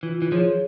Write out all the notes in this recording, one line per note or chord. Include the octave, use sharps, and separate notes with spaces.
E3 F4
E3
F3 G#4 C#5